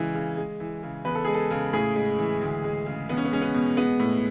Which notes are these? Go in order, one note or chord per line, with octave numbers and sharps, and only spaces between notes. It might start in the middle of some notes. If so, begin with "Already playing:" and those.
Already playing: C#3 E3 G#3
C#3
G#3
E3
C#3
E2 B4
A4
G#3 G#4
A4
C#3
A2 G#4
G#3
E3
D2
G#3
C#3
E2 B3
C#4
B3
G#3 C#4
B3
B2
G#3 B3
A2